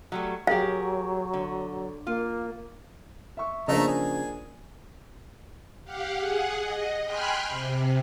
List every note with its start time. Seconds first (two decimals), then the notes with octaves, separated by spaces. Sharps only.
0.12 F#3 G3 A3
0.47 F#3 G4 G#4 A#4 F5
1.33 D3
2.07 A#3 F4
3.37 E5 C#6
3.68 C#3 F3 A3 A#3 D4 D#5 A#5
3.88 G#4
5.84 G4 F5 F#5
6.16 G#4 F#5
6.62 D#5
7.04 G5 G#5 B5 C6 F6 F#6
7.47 C3